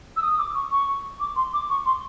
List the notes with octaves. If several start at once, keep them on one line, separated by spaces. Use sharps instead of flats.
E6
D#6
D6
C#6
C#6
D6
C6
D6
C#6
C6